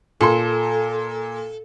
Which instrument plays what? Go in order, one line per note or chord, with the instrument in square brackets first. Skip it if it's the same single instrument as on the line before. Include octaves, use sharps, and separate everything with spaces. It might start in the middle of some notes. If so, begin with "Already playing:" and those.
[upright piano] A#2 C6 [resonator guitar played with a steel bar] A4